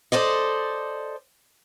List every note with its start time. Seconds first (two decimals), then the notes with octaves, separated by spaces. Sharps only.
0.12 A4 C5 D5 D#5